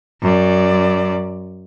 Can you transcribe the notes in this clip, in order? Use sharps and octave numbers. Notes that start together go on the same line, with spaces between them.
F#2 D5